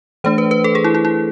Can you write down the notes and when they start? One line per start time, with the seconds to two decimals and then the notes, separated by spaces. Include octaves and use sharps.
0.24 E3 A3 D4 C5
0.38 B4
0.51 B4
0.64 A4
0.75 G#4
0.84 E4
0.95 E4
1.05 E4